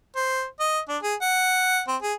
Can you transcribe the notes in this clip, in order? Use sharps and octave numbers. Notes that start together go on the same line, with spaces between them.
C5
D#5
D4
G#4
F#5
C4
G#4